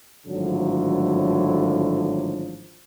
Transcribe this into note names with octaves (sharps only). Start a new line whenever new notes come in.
G#1 A2 D3 F3 F#3